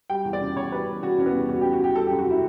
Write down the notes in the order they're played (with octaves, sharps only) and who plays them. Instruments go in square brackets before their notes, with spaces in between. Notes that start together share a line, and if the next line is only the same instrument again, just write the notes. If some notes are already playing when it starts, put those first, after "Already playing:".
[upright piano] G3 G5
E2
D5
C#3
E2 C#5
G3 B4
E2
C#3 F#4
E2 C#4
B3
G3
E2 F#4
G4
C#3
F#4
E2 G4
G3 A4
G4
F#2
F#4
C#3 E4